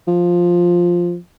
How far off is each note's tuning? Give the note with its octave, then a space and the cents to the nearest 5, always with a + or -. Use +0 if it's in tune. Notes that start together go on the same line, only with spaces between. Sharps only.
F3 +5